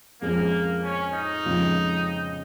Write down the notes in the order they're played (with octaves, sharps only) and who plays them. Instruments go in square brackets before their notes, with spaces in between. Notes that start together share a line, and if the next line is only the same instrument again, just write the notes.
[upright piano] F2 F3 G#3 C#4 G#4 [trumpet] A#3
[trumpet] C#4
D#4
[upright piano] F2 C#3 F3 G#3 F4